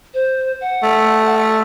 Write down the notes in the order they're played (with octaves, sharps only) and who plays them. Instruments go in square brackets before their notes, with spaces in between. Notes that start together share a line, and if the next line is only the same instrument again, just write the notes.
[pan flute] C5
F#5
[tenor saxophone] A3